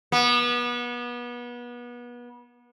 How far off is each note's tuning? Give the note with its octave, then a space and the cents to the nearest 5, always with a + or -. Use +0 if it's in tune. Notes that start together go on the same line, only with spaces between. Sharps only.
B3 -30